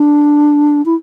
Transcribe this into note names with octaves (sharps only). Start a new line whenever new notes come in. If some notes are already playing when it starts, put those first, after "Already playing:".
Already playing: D4
E4